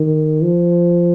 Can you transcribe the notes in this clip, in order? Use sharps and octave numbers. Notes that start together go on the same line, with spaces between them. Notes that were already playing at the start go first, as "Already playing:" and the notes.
Already playing: D#3
F3